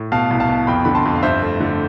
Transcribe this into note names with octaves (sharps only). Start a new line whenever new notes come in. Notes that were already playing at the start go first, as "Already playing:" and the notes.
Already playing: A2
B2 F5 A5
C2
F5 A5
B2
F2 G5 B5
D3 B5
A5 C6
F2
F5
G2 C5 E5
A3
D3